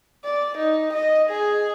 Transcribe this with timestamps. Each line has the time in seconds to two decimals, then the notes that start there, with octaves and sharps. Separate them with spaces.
0.24 D5
0.58 D#4
0.94 D#5
1.30 G#4